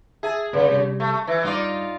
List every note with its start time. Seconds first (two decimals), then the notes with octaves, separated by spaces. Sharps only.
0.23 G#4 E5 A5
0.53 G1 C#3 B4
0.68 C3 G3
1.00 A3
1.27 E3 E5
1.43 G2 D#4 F4 D5 D6